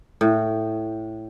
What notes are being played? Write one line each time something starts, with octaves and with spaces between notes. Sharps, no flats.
A2